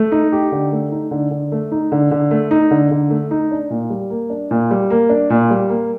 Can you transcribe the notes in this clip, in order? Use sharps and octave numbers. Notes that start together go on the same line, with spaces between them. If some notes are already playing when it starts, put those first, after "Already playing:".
Already playing: A3
D#4
G4
D3
A3
D#4
D3
D3
A3
D#4
D3
D3
A3
D#4
D3
D3
A3
D#4
D4
A#2
G3
A#3
D4
A#2
G3
A#3
D4
A#2
G3
A#3